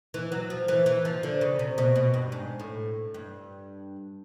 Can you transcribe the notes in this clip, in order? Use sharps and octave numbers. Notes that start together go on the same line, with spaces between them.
E3
F#3
F3
E3
E3
F3
D3
C#3
C3
B2
B2
G2
G#2
A2
G2